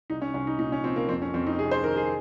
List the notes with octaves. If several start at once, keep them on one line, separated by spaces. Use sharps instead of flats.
C2 D#4
C#4
C2 C#4
D#4
A#2 D#4
C#4
F3 C4
A#3
F2 C4
C#4
F2 C4
D#4
C3 G#4
C5
D#3 A#4
G#4